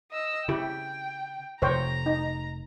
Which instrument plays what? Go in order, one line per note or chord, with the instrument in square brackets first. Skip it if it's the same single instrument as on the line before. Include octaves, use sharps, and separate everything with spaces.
[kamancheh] D#5 E6
[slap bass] C#3 [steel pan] E4 G4 [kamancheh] G5
[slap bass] F1 [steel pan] C5 C#5 G5 [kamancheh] A#5
[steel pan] D#4